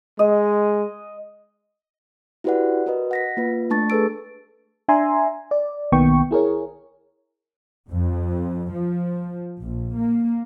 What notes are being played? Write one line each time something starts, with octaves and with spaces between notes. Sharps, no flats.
G#3 D#5
E4 F#4 G4 B4 D5 F#5
F#4 A#4 B4 D#5
F#5 A#6 B6
A#3 F4 B4
A3 D4 A5 C#6 A6
G#4 A4 B4 E6 D7
D4 E5 G#5 A#5 C6
D5
B1 D#3 A#3 B3 G5 C#6
E4 G#4 A#4 C#5
F2
F3
A#1
A#3